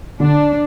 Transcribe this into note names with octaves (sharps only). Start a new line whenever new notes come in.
D3 D4